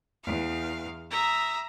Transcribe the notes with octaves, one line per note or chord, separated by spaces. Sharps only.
E2 F5
E5 A#5 D#6